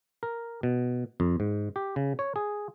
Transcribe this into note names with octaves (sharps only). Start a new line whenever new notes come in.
A#4
B2
F2
G#2
G4
C#3
C#5
G#4